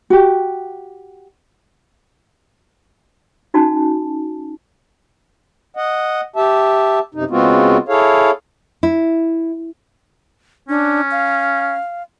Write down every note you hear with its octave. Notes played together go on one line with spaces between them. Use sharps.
F#4 G4
C#4 D#4 F#4 G#5 A5
D#5 F#5
G4 E5 A5
F#2 C3 D#4
C#3 G#3 B3 C4 F4 F#4
E4 G#4 A4 C#5 F5
E4
C#4 D4
F5